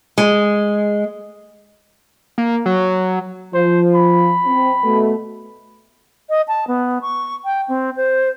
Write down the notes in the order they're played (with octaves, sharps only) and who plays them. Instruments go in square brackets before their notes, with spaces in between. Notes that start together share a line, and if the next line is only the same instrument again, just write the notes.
[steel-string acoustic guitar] G#3
[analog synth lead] A#3
F#3
[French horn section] F3 [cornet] C5
[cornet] B5
[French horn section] C4
B2 A3
[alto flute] D#5
A5
B3
C#6
G5
C4
C5